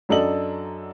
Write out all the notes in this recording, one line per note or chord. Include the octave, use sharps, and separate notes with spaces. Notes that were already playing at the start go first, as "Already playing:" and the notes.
F#2 F#3 D4 A4 D#5 F#7